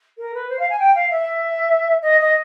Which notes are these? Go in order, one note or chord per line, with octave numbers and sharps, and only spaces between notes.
A#4
B4
C5
F5
G#5
G5
F5
E5
D#5
D#5